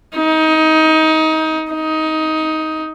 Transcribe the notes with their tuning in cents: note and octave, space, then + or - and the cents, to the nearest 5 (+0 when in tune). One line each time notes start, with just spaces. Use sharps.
D#4 +25
D#4 +15